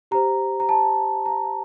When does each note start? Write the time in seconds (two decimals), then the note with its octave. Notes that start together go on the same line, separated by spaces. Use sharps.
0.11 G4 C5 A#5
0.60 A#5
0.69 A5
1.26 A#5